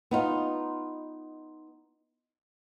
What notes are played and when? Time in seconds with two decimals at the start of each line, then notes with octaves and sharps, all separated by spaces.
0.11 B3 D#4 F4